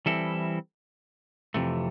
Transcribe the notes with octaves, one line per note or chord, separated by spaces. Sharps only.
E3 G3 C4 E4 A4
F2 C3 E3 A3